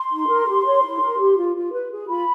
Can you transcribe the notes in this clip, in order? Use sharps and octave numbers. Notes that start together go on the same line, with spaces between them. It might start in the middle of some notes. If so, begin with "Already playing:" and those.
Already playing: C6
D#4
A#4
G4
C#5
E4
A#4
G4
F4
F4
B4
G#4
F4 B5